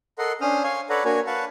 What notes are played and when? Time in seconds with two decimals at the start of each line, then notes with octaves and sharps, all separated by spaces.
0.19 A4 A#4 D#5 F#5 C6
0.41 C#4 D4 C5 D#6 F6
0.64 C#5 F5 G#5 C6
0.90 A4 B4 C#5 D5 F#5 A#5
1.05 A#3 D4 F#4 A#4 C#5 G#5
1.27 B4 F5 F#5 A5 C#6